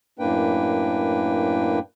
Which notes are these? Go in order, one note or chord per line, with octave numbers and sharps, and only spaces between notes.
F#2 A2 A#3 D4 B4 G5